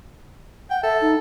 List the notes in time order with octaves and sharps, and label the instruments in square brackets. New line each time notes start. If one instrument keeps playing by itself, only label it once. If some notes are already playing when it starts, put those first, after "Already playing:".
[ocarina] F#5 [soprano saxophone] G5
[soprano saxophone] A4 [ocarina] E5
[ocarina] D#4